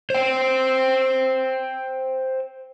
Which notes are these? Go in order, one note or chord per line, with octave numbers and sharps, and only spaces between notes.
C5 G5